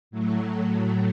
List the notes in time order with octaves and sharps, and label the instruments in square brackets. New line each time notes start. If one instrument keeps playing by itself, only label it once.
[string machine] A2 F#3 A3